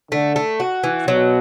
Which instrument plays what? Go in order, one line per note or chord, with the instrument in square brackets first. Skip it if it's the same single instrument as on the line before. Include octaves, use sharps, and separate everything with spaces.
[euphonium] D3 [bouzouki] A3
[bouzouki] A3
F#4
E3
[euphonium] B2 [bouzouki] F#3